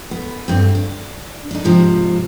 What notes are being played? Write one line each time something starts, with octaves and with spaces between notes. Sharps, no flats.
B3
D2 G2 C4
D4
D4 D#4
G#2 C3 F3